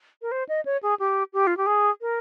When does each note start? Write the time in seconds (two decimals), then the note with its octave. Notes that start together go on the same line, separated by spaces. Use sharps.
0.22 A#4
0.32 C5
0.49 D#5
0.65 C#5
0.83 G#4
0.99 G4
1.33 G4
1.47 F4
1.57 G4
1.67 G#4
2.01 A#4